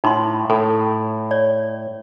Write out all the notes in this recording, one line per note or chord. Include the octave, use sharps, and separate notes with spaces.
A2 D#4 E4 C6
A2 A4
C#5 D5